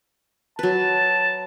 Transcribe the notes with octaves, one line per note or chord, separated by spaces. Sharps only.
F#3 B4 A5